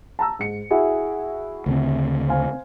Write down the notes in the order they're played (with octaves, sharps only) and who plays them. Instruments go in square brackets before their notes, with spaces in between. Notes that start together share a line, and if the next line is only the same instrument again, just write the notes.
[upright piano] A5 A#5 E6
G#2 C#7
E4 F#4 G#4
[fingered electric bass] D2 C#3 C4
[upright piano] C5 F5 G#5